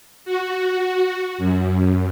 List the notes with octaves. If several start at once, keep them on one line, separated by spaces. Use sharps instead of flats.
F#4
F#2